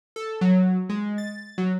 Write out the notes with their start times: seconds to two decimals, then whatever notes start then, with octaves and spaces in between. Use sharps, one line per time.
0.16 A4
0.41 F#3
0.89 G#3
1.18 A6
1.58 F#3